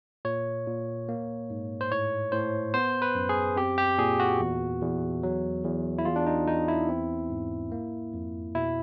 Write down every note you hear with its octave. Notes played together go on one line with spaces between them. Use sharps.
A#2 C#5
A#2
A#3
G#2
C5
A2 C#5
A2 C5
B3 C5
B4
F#2
G#4
C4 G4
G4
A#2 G#4
F#4
E2
E2
F#3
E2
E4
E2 F4
D4
D#4
E2 D#4
E4
C4
G#2
A#3
F2
B2 E4